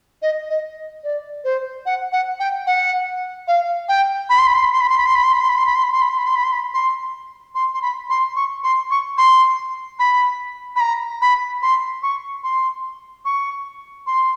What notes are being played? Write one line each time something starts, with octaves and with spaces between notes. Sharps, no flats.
D#5
D#5
D5
C5
F#5
F#5
G5
F#5
F5
G5
B5
C6
B5
C6
B5
C6
B5
C6
B5
C6
B5
C6
B5
C6
B5
C6
B5
C6
B5
C6
B5
C6
B5
C6
B5
C6
B5
C6
C6
C6
B5
C6
C#6
C6
C#6
C6
B5
B5
A#5
B5
C6
C#6
C6
C#6
C6